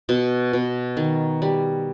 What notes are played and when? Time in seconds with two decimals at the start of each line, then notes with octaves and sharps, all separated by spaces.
0.09 B2
0.53 B2
0.97 D#3
1.42 G3